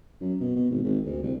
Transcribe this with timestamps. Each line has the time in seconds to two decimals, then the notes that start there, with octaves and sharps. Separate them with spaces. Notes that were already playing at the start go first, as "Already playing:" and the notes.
0.21 F#2
0.40 B2
0.56 B2
0.70 G#1
0.84 G#1
1.05 D2
1.23 C2